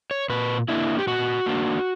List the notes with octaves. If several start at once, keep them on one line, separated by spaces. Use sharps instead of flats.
C#5
A#2 B4
A#3 D4 E4
G4
A#2 F#4
A#3 D4